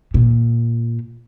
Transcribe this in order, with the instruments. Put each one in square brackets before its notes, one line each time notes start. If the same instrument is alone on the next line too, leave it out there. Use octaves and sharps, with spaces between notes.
[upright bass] A#2